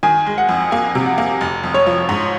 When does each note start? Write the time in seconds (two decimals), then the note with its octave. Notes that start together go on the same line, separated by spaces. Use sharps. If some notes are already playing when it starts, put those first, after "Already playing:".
0.03 D#3 G#5
0.26 G#3
0.38 F#5
0.49 F2
0.71 A#3 G#5
0.95 C3
1.06 F#5
1.18 A#3
1.41 F1
1.64 F2
1.74 C#5
1.87 F3
2.09 G#2